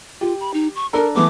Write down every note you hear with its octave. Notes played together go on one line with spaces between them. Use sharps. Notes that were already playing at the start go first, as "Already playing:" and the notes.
F4 G4
B5
D#4
C#6
D4 A4 A#4 A#5
E3 A3 B3 D6